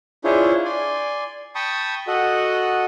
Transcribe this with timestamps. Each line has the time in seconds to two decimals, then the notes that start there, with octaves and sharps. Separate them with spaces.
0.24 D4 E4 F4 G#4 C5 C#5
0.65 D5 G#5 C6
1.55 G5 A5 B5 C#6 D#6
2.07 F#4 A4 D#5 F#5